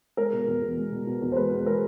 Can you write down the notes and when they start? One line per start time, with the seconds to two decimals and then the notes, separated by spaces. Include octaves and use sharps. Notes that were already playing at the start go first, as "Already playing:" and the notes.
0.17 G#3 A#4
0.33 B2
0.48 E2
0.62 E2
0.77 G#3
0.92 B2
1.07 B2
1.22 E2
1.32 C5
1.36 G#3 B4
1.52 E2
1.66 G#3 A#4